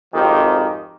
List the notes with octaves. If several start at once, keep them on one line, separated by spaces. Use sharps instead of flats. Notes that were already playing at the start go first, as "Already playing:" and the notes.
G#1 F2 D#3 F3 G4